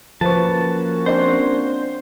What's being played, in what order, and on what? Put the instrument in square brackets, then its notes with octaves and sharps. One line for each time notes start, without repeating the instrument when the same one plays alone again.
[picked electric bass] F3 [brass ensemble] A#3 C#4 F#4 [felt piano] B4 C5 C#6 [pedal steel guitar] A5
[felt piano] C4 D4 C6 [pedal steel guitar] C5